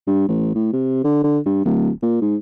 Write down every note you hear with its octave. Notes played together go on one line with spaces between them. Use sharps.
G2
A1
A2
C3
D3
D3
G2
D1
A#2
G#2